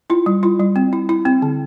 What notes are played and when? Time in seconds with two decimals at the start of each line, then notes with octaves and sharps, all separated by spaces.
0.10 E4 F4
0.26 G3
0.43 E4 F4
0.60 G3
0.76 C4
0.93 E4
1.09 E4
1.25 C4
1.42 D3